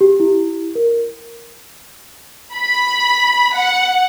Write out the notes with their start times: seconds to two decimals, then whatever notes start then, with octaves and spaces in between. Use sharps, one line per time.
0.01 G4
0.20 E4
0.75 A#4
2.56 B5
3.55 F#5